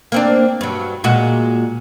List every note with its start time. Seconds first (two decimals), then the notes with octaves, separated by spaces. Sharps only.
0.12 A#3 C4 D4
0.61 G2 F#3
1.04 A#2 G#3 F#4